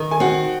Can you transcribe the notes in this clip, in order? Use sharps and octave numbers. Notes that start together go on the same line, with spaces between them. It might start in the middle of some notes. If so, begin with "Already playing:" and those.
Already playing: D#3
G#5
C4 F#4 F#5